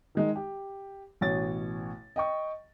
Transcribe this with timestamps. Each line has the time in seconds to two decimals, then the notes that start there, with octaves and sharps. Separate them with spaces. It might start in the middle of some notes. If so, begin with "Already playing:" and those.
0.15 D#3 G#3 D#4
0.36 G4
1.21 A1 B2 C#5 A6
2.16 D#5 G5 C#6